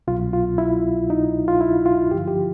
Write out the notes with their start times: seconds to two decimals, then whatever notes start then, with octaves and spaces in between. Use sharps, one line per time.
0.08 C2 B2 F#3 F4
0.33 F4
0.58 E4
1.10 D#4
1.48 F4
1.61 E4
1.86 F4
2.11 G2 D3 F3 G4
2.28 G4